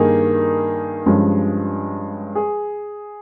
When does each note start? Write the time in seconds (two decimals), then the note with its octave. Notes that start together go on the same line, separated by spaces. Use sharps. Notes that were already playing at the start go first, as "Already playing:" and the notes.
Already playing: G2 D#3 A#3 D#4 G#4
1.06 G2 F3 G#3 C#4
2.35 G#4